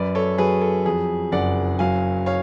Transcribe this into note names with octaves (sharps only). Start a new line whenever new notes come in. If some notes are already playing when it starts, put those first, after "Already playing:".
Already playing: F#2 B4 D5
A4 C#5
F#3 G#4 B4
A4
F2 G#4
F#1 D5 F#5
F#3 F5 G#5
C#5 F5